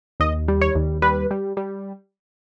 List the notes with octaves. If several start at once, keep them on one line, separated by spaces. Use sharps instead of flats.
D#2 D#5
G3
C#5
D#2
G3 B4
G3
G3